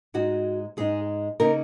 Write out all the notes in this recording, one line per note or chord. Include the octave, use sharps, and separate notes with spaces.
G#2 G#3 D#4 F#4
G#2 G#3 D#4 G#4
C#3 A#3 D#4 A#4